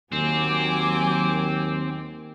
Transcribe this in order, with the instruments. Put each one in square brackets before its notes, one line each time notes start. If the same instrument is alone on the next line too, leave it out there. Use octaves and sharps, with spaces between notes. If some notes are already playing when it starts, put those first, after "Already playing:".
[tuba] D#2 [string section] F#3 G#5 D6 [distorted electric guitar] C4